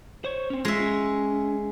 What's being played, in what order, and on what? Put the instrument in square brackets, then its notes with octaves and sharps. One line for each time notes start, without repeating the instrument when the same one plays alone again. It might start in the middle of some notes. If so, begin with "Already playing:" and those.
[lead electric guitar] C5 C#5
C4 C#4
[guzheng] G#3 E5 [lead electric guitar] F4
[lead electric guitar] C#4